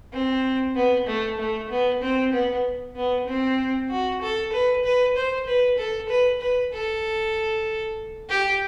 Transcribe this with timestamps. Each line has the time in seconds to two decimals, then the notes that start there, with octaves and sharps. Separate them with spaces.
0.13 C4
0.75 B3
1.07 A3
1.39 A3
1.70 B3
2.02 C4
2.33 B3
2.96 B3
3.27 C4
3.90 F#4
4.22 A4
4.53 B4
4.84 B4
5.16 C5
5.46 B4
5.78 A4
6.09 B4
6.41 B4
6.73 A4
8.30 G4